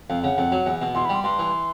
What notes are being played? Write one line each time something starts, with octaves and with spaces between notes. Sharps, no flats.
F2 F5
C#3 F#5
F2
F#3
E2
B2
E2 C6
B5
G3 C6
G2 C6
E3